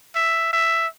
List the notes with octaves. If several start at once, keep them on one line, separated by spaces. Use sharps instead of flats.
E5
E5